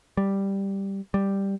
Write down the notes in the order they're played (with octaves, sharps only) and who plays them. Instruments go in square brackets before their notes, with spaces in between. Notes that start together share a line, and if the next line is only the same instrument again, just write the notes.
[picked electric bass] G3
G3